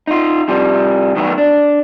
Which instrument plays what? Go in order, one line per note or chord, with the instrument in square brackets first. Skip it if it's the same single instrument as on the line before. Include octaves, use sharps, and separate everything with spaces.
[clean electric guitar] D#4 F4
C3 F3 G3
D#3 F#3 A3 B3
D4